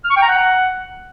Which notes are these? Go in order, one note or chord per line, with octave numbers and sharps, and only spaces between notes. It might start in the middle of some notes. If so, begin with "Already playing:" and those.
F6
C#6
G5
A#5
F#5